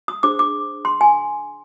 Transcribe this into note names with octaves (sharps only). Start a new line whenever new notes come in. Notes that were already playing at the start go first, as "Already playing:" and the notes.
D#6
D4 G#4 C5 D6
D6
C6
G#5